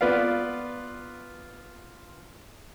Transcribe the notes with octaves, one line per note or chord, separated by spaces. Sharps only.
B3 F4 B4 D5 F5